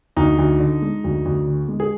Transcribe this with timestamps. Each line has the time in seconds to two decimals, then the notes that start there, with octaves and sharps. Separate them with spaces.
0.16 D2 D#4
0.38 D2
0.60 D3
0.82 G#3
1.04 D2
1.25 D2
1.47 D3
1.68 G#3
1.80 G#4